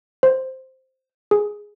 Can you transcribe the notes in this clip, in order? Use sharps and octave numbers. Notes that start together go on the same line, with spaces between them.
C5
G#4